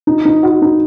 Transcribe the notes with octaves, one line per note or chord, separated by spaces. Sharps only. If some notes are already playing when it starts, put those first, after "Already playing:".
D#4
D#4
F#4
D#4